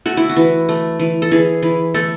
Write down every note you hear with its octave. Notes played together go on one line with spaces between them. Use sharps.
A3 F#4
E4
F#4
E3
A3
E3
A4
E3 G#4
E3
A3 A4